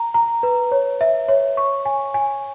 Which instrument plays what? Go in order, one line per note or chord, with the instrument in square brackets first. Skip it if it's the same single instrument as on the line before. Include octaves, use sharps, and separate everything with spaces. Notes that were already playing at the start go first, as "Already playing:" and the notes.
Already playing: [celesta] A#5
A#5
B4
C#5
E5
C#5
C#6
G#5
G#5